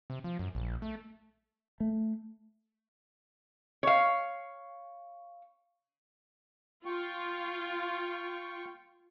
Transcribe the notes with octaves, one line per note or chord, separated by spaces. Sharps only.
C3
F3
F#2
A#1
A3
A3
C#5 F5
F4 G5 C#6